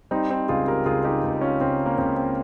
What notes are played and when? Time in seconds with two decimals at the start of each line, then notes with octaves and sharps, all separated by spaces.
0.11 G3 C4 D#4
0.30 C4 D#4
0.49 C#2 F4 G#4
0.67 G4 A#4
0.85 C#2 F4 G#4
1.04 D#4 G4
1.23 C#2
1.41 C#4 F4
1.61 C#2 C4
1.86 A#3
1.98 C#2 C4
2.17 C4